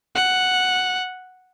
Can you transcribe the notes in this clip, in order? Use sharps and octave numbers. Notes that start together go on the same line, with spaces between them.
F#5